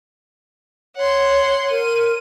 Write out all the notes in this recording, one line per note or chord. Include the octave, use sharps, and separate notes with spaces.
C#5 F#5 C6
A#4 D#7